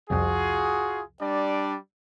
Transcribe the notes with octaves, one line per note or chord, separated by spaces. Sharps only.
C2 F2 F4 F#4 G#4
G3 D4 D5